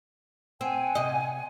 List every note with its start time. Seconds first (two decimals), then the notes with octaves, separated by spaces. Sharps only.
0.61 C4 F#5 G#5
0.95 C3 D#5